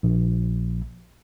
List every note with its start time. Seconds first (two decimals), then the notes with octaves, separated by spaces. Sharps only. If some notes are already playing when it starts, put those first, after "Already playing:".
0.03 A#1